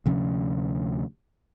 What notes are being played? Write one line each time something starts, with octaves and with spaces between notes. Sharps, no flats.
D2 C3 F3 C#4